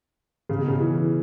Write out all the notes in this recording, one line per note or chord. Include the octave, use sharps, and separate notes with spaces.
C#3
B2
C#3
E3